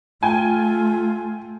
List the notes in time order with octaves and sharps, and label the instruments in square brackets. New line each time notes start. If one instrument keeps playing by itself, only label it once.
[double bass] A3 [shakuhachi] F4 [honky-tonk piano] G5 G#5